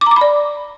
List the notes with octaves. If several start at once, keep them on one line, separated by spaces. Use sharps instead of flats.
D6
A#5
D6
B5
D5